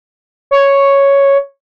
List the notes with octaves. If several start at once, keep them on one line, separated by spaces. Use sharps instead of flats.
C#5